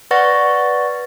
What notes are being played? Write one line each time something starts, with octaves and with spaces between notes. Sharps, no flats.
B4 D5 F#5 C#6 A6 A#6